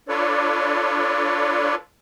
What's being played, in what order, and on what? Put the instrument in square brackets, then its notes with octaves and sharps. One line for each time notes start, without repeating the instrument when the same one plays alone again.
[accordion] D4 F4 A4 B4 C#5 D5